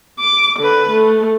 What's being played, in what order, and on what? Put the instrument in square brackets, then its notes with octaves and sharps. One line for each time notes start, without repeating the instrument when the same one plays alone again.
[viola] D6
D3 B4
A3